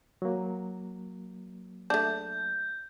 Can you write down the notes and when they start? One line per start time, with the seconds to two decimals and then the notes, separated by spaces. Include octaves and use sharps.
0.22 F#3 A#3
1.90 A3 D4 G6